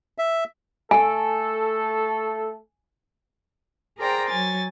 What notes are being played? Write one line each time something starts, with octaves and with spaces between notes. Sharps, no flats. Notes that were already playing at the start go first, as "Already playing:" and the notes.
E5
A3 A4 G#5
G#4 A#4 C5 D5 G5 A#5
F#3 G#5 A6